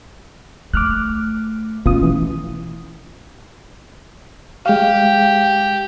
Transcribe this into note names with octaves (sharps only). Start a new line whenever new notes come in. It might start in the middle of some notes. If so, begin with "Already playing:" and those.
A3 D6 F6 F#6
B2 A3 C#4 F4 D#6
E3
G#3 G4 F5